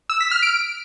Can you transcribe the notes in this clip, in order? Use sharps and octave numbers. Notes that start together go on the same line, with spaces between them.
E6
B6
F6
D7